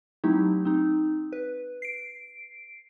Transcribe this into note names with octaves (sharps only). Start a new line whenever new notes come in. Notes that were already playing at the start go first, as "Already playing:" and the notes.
F#3 A3 C4 D#4 E4 G4
C4 D#4
B4
C7 D7